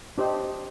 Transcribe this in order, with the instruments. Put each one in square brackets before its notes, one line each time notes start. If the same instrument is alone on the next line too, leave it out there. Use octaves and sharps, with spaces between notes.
[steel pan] D4 G4 C5 D#5